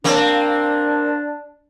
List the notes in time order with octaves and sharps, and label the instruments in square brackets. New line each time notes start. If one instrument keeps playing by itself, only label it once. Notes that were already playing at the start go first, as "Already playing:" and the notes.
[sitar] A#3 C4 [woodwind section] D4